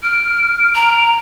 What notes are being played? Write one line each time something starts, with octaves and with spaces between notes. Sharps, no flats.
F6 D7
A#5